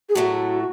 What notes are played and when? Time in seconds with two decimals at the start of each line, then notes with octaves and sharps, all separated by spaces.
0.09 G#4
0.15 A2 F#3 A3 F#4